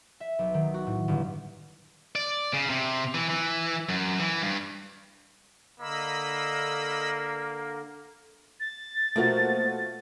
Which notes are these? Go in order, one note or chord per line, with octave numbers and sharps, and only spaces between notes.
E5
B1
D#3
F#4
A2
G1
D5
C#3
C3
E3
E3
F#2
E3
G2
D3 A#3 D#5 B5 E6
A6
B2 F3 A3 A#3 F4 F#4